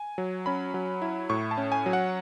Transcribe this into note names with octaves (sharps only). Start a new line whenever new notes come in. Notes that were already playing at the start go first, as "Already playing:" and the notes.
Already playing: G#5
F#3
C#4 B5
F#3
E4
A2 C#6
A5
C#4
G#5
F#3
F#5